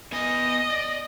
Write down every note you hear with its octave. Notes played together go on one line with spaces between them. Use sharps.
B3 D#5 G#5
D5